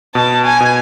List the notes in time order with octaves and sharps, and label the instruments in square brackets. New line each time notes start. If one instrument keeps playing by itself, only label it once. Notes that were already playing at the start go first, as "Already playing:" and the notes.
[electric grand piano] B2 [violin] A5
[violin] G#5
[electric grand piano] B2